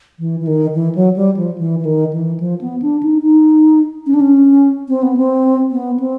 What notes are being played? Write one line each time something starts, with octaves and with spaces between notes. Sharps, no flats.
E3
E3
D#3
E3
F#3
G3
F3
E3
E3
D#3
E3
F3
B3
D4
D#4
D#4
C#4
D4
C#4
C4
B3
C4
B3
C4